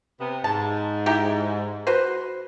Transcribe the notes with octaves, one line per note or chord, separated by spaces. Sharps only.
C3 B3
G#2 A5
D#4 E4 G4
F#4 B4 C5